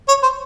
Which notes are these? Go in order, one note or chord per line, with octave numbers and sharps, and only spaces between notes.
C#5
C5